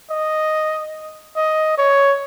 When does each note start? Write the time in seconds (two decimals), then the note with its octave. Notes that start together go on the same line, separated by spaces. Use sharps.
0.10 D#5
1.36 D#5
1.78 C#5